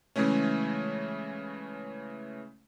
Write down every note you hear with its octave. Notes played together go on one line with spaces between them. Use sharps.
C#3 E3 G#3 A3 C#4